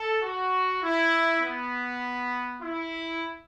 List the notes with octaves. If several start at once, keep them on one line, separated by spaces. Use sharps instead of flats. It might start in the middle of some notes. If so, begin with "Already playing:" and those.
Already playing: A4
F#4
E4
B3
E4